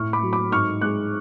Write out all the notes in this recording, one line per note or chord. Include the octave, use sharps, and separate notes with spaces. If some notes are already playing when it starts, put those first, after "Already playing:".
Already playing: A2 C#6 F6
B5 D6
F#3
B5 D6
G#2 C#6 F6
G#3 D6 F#6